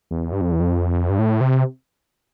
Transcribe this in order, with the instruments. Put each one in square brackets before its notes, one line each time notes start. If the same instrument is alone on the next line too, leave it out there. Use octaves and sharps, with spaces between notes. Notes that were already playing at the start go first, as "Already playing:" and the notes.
[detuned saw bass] E2
G2
F2
E2
F2
G2
A2
C3